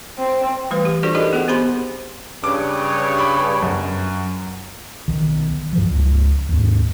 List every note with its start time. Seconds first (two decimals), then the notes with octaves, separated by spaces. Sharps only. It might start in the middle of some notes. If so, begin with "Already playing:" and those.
0.19 C4
0.71 E3 G3 A3 B4
0.85 G4
1.03 D4 F4 F#4 A4 C5 D5
1.15 D#4 G4 A4 A#4 D#5
1.33 B3 G#4 F#5
1.48 C4 G4 C5 B5 C6
2.44 G2 C#3 C#5 D6
3.18 B5 D6
3.62 F#2
5.08 B1 D#3
5.73 G2 F3
5.90 C#2
6.49 D#2 G#2